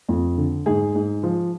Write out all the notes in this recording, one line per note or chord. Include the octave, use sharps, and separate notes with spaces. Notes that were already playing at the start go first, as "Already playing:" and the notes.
F2
D3
G#2 G#4
G#2
F3